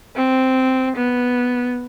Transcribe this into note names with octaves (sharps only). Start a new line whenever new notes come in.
C4
B3